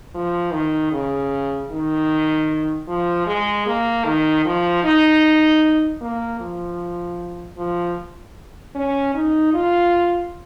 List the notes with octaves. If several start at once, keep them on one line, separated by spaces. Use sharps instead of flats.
F3
D#3
C#3
D#3
F3
G#3
A#3
D#3
F3
D#4
A#3
F3
F3
C#4
D#4
F4